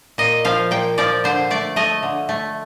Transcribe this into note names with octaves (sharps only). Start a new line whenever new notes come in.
A#2 D#5
F3 F5
A#2 G5
F3 D5
D3 C5
A3 D5
A3 D#5
D3
A3